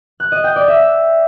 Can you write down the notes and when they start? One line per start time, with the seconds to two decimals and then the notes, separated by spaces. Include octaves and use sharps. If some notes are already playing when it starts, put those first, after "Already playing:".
0.20 F#6
0.32 D#5
0.44 G5
0.56 D5
0.68 E5